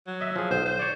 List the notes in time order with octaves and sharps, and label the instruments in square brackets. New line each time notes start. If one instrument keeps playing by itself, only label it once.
[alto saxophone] F#3
[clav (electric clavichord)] D#5 E5
F3 G#4
[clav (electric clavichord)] B1 [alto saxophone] C5
[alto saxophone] C5
[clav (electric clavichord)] C#5 D5